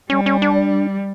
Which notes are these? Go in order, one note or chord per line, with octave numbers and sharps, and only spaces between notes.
G3 C#4
C#4
D4